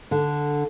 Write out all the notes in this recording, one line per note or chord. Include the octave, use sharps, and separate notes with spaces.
D3